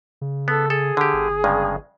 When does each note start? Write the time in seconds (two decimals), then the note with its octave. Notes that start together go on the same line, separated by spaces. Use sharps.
0.21 C#3
0.48 B3 A4
0.70 G#4 A4
0.97 D3 G4
1.13 G1
1.44 G2 C#3 G#3